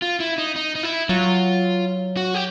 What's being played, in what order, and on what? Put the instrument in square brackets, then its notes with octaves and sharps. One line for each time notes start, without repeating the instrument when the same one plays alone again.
[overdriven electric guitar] F4
E4
D#4
D#4
D#4
E4
[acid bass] F#3 [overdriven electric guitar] F4
[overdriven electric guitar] F#4
G4